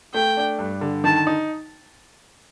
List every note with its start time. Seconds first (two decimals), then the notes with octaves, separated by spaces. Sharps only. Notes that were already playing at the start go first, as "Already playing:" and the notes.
0.14 A3 G5
0.37 D4
0.59 G2
0.81 D3
1.04 D#3 A5
1.27 D#4